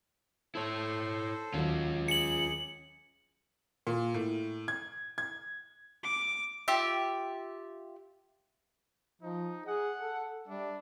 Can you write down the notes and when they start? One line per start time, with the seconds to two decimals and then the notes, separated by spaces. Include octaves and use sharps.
0.55 E4 A4 C5 C#5
1.54 D#2 D#3 F#3 C#4 F4
2.08 G#4 C#7 F#7
3.87 A#2
4.14 A2
4.68 G#6
5.18 G#6
6.04 D6
6.68 F4 G4 E5
9.22 F3 D#4
9.66 G#4 F#5
9.99 A4
10.48 G3 D4 E5